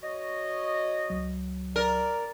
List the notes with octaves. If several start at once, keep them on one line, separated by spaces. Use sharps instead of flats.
F#4 C#5 D#5
C#2 F#3
A#4 D5